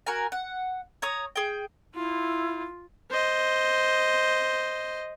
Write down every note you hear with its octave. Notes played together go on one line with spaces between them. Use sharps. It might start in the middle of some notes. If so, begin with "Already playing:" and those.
F#4 A#4 G#5
F#5
C#5 A#5 D#6
G#4 G5
E4 F4
C5 D#5